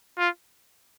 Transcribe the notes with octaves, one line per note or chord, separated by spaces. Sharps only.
F4